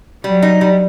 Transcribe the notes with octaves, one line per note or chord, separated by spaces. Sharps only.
F#3 G3
D#4
G3